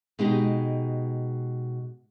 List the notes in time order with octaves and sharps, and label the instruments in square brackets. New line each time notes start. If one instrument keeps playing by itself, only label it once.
[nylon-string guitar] B2 G#3 D#4 G4